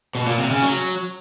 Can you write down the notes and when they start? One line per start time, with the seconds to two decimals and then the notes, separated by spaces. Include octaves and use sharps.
0.15 B2
0.27 A#2
0.39 C3
0.51 C#3
0.63 F#3